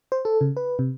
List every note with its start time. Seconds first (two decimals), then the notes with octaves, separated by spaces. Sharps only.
0.12 C5
0.25 A4
0.41 C#3
0.57 B4
0.79 C3